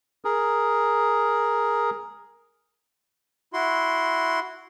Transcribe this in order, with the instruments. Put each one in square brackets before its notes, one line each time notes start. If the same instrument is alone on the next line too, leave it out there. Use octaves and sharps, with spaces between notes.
[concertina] G#4 A#4
[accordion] E4 F#4 C6